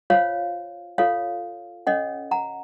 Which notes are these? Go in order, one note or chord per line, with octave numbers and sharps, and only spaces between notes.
F4 C5 C#5 F5
F4 A4 C#5 F5
C#4 A4 C#5 D#5 F#5
F#5 A#5